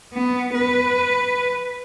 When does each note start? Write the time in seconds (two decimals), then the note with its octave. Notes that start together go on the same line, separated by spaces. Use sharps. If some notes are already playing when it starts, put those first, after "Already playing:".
0.14 B3
0.54 B4